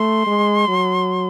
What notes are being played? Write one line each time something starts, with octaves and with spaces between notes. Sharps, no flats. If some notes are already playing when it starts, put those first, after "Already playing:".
Already playing: A3 C6
G#3
F#3